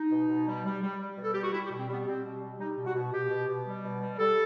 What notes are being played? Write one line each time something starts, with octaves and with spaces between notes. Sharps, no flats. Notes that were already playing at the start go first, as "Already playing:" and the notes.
Already playing: D#4
B2
B2
G3
G3
G3
G3
B2
A4
G3 G4
F#4
G3 E4
G4
B2
C4
G3 B3
G3 C4
B2
G3
G3 D#4
B2
F#4
B2
B2 G4
B2
B2
G3
B2
G3
G3 A4